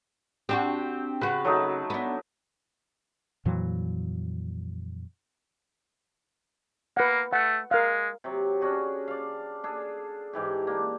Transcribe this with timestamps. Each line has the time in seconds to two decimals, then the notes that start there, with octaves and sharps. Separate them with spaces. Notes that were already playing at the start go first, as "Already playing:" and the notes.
0.49 C4 D4 F#4 G4
1.21 C#3 F#4 B4
1.45 F#3 A3 D#4
1.90 B3 D4
3.45 F2 A#2 E3 F#3
6.97 A#3 B4 F#5
7.33 A3 F#5
7.71 G#3 A#4 F5
8.24 C3 F#3
8.61 C#4 D4 F#4 G#4
9.08 D5 F5
9.64 D4 G#4 A4
10.33 G#2 E3 G4
10.67 A#3 D4